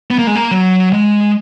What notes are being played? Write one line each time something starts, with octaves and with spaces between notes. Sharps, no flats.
B3
A#3
G#3
A#3
F#3
G#3